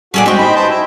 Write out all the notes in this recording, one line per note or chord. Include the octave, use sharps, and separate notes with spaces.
A#2 G3 C#4 F#4 G#4 A4 D5
G#3 C4 D4 F#4 G4 D#5 G5 C#6
D#4 C5 B5
B4 C5 A5
E4